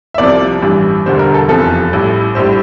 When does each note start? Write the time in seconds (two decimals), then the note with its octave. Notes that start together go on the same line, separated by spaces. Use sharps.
0.14 E5
0.18 C2 C3 F3 D5
0.62 A1 G2 E3 G3
1.06 E1 D2 D3 G3 C5
1.19 A#4
1.34 A4
1.48 F1 E2 C3 F3 A4
1.92 A1 A2 G3
2.35 A#1 A2 G3 C5